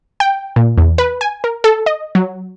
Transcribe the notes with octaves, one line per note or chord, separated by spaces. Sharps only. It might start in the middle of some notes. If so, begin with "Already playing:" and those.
G5
A#2
E2
B4
G#5
A#4
A4
D#5
F#3